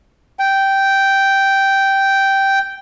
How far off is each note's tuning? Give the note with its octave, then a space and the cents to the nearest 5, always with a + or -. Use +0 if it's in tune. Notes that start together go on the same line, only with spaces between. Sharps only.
G5 -5